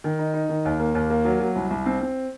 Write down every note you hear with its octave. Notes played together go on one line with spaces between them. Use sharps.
D#3
D#4
D#4
D#3
D#2
A#3
D#2
A#3
F#3
F#3
C2
C2
C4
C4